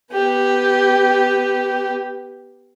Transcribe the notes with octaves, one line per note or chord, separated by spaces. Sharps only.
B3 G4